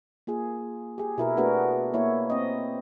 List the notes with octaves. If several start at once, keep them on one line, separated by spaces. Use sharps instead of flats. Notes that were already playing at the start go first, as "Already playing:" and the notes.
A#3 F4 G#4
G4 G#4
B2 E4 A#4
A3 B3 D4 F#4 G#4 A#4
A#3 E4 C#5
C4 D#5